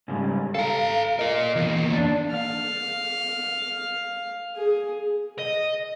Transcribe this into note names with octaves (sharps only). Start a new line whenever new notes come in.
G#2 C#3 G3
A4 F5 A#5
F4 A#4 D#5
E2 A#3
D4 D5
F5
G#4
D#5